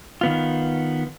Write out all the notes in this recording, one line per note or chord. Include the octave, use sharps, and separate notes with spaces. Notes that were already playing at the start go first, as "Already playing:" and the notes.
D#3 B3 F4